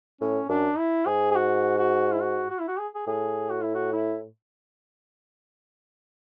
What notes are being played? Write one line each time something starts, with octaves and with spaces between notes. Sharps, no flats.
A2 C#4
F#2 D4
E4
G#2 G#4
G#4
F#4
F#4
E4
F#4
F#4
E4
F#4
G#4
G#4
A2 G#4
F#4
E4
F#4
E4